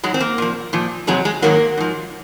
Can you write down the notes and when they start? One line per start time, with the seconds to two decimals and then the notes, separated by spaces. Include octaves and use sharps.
0.03 G#2 F#3 G#3
0.14 C4
0.20 A#3
0.38 A#2 F3
0.73 A#2 F3
1.07 F2 C3 F#3 G#3
1.25 G#3
1.42 G#2 D#3 F#3 A#3
1.77 G#2 F3